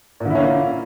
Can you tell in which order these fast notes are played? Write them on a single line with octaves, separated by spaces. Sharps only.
A#2 D3 E4 C#4 A#3